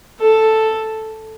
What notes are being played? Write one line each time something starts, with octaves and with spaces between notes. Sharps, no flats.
A4